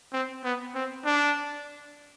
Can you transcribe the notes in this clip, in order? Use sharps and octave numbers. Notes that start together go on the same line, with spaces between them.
C4
B3
C4
D4